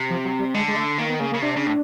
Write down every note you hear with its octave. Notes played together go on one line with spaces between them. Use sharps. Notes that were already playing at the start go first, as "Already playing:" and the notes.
Already playing: C3
F3
F#3
G3
D3 G#3
G#3
A3
D#3 A#3
B3
C#3 A#3
C#3 A#3
C3 D4
C#3
A2